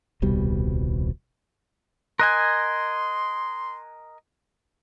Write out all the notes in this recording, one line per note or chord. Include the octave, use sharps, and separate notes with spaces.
D#1 C2 B2 G3
A#4 D#5 G#5 C6 F#6 G#6